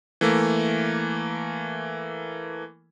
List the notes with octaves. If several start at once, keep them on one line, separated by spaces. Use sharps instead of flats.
E3 A3 A#3